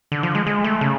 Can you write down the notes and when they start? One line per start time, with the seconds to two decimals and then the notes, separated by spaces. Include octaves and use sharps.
0.12 D3
0.23 F3
0.35 G#3
0.47 G#3
0.64 A3
0.81 C#3